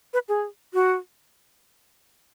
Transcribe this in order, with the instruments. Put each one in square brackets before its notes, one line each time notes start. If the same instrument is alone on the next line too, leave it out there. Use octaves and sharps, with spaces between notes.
[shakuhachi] B4
G#4
F#4